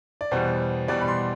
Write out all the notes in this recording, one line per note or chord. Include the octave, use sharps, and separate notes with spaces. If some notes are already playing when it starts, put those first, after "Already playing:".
D5
E2 B2 G3 C5
E2 B2 G3 D5
B5
C6